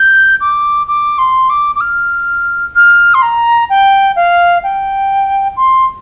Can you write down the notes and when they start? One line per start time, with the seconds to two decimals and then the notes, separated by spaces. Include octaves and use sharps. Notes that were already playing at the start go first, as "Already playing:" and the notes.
Already playing: G6
0.41 D6
0.88 D6
1.18 C6
1.50 D6
1.76 D6
1.81 F6
2.76 F6
3.14 C6
3.22 A#5
3.70 G5
4.16 F5
4.63 G5
5.57 C6